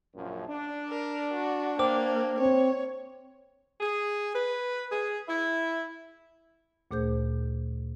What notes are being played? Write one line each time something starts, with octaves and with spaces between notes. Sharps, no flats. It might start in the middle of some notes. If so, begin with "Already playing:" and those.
A#1 F#2 F3
D4
A#4
F#4
A#3 C5 G5 D6
C4 C#5
G#4
B4
G#4
E4
D2 A#2 A3 G#4 C5 G6